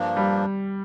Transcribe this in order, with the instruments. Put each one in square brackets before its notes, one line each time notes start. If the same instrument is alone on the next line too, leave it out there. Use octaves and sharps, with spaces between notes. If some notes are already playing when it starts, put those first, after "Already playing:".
Already playing: [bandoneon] G2 F3 A#3 D4
[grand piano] G3